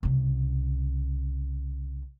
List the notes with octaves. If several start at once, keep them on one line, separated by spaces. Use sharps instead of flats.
C2 C#3